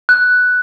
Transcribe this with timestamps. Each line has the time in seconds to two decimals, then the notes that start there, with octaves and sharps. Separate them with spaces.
0.09 F#6